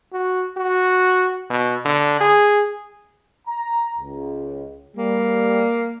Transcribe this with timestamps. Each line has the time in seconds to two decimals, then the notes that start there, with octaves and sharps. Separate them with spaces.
0.13 F#4
0.57 F#4
1.50 B2
1.85 D3
2.21 G#4
3.48 A#5
3.99 C#2
4.97 G3 A#3